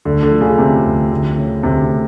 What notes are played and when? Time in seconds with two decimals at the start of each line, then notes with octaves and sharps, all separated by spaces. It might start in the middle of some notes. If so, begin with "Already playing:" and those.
0.05 D2 D3
0.23 D3
0.31 F3
0.41 C#3
0.58 D2 C3
0.85 D2
1.11 D2
1.38 C#3
1.63 D2 C3